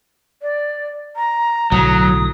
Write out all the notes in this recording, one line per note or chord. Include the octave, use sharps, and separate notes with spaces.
D5
A#5
B1 A2 D3 F#3 D#6